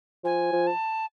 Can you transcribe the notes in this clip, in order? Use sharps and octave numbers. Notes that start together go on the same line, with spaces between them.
F3 G#5
F3
A5